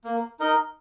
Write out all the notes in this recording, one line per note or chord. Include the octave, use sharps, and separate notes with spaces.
A#3
D#4 A#4 D#5